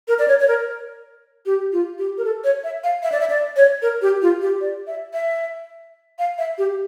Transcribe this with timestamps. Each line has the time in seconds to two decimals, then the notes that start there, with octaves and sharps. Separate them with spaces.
0.08 A#4
0.19 D5
0.28 C#5
0.40 C#5
0.48 A#4
1.46 G4
1.72 F4
1.99 G4
2.18 A#4
2.25 A4
2.44 C#5
2.64 E5
2.84 F5
3.03 E5
3.12 D5
3.20 E5
3.30 D5
3.56 C#5
3.82 A#4
4.02 G4
4.22 F4
4.41 G4
4.61 D5
4.87 E5
5.13 E5
6.19 F5
6.38 E5
6.58 G4